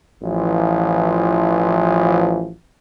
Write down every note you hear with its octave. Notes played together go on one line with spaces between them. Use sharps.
A1 E3 F3